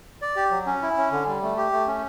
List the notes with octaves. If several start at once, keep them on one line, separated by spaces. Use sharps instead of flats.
D5
G4
F#3
C#4
E4
C#4
D3
G3
A3
G4
A3
C#4